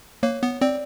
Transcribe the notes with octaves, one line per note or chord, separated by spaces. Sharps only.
A#3 C#5
B3
C4 D5